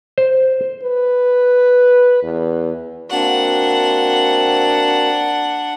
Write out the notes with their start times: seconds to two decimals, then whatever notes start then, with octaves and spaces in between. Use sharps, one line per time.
0.18 C5
0.83 B4
2.23 E2
3.10 A#3 C4 D4 F#4 F#5